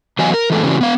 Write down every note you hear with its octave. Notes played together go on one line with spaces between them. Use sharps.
E3 F#3 B3 D#5 F5 G#5
A#4
E3 G#3 A3 B3 A4
C#3 E3 C#4 D4 E4 F#4
B3 F5